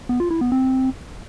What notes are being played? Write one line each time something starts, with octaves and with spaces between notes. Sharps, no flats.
B3
F4
E4
B3
C4